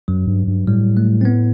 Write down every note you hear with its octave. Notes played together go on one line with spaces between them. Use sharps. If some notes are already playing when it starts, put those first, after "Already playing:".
F#2 F#3
G2
G2
A2 G3
A3
C4
B3